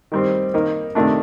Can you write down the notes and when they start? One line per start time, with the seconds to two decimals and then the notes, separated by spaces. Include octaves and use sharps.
0.12 D#3 G3 C4
0.54 D#3 A#3 D#4
0.95 C3 D#3 A3 D4